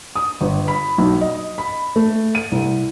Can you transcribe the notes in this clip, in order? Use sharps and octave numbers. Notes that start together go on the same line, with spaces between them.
D#6
G1
B5
B1
D#5
B5
A3
D#7
C2